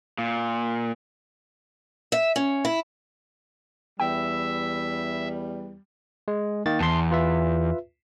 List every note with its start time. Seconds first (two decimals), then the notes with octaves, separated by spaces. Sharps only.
0.18 A#2
2.12 E5
2.36 C#4
2.65 E4
4.00 E2 G3 E5 G5
6.28 G#3
6.66 D#3 A#3 A6
6.80 E2 A5 C6
7.11 F4 B4 E5